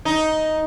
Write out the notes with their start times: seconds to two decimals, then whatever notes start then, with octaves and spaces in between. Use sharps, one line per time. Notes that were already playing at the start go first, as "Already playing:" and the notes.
0.05 D#4